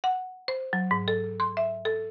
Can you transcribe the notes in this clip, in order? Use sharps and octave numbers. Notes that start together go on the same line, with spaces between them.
F#5
C5
F#3
G#2
A4
C6
E5
A4